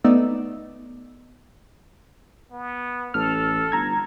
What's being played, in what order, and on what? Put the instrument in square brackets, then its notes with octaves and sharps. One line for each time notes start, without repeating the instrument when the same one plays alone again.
[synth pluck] A3 B3 D#4 D5 D#5 E6
[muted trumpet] B3
[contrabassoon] A1 [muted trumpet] A4 [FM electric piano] F6
[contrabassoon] G1 [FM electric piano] A#5 G#6